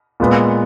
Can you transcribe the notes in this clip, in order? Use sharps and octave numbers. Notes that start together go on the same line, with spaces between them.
A#2 G#3 B3